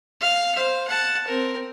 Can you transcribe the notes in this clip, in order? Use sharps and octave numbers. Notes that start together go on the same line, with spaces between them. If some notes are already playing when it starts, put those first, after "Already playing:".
F5
C5 F5
F#5 A5
C4 A#4